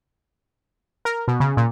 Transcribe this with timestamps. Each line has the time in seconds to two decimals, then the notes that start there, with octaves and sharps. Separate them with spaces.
1.05 A#4
1.28 B2
1.40 C#3
1.57 A#2